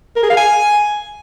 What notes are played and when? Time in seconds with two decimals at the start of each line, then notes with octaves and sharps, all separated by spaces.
0.16 A#4
0.23 G#4
0.30 F5
0.37 G#5